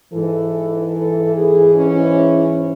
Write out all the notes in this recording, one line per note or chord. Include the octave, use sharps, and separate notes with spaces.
G#2 E3 A4
A4
G#4
C#4